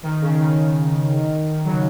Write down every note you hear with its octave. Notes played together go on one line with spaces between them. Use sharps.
D#3
C#3
D#3
C#3 F#3